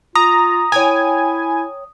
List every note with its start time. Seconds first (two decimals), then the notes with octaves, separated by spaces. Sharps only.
0.16 F4 A#5 D#6
0.72 E4 C#5 G5 G#5 A#5